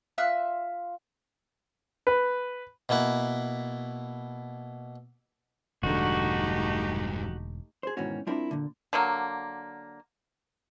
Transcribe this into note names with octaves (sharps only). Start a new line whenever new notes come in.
F4 E5 E6 F#6
B4
B2 A#3 E4 B4
E1 G2 D3 G#3 A3 D#4 F#4 G4
G#4 C5
G#2 B2 D#3 E3 C#4 F#4
G3 C4 D4 E4 F4 A#4
A#2 D3
D3 F#3 A#3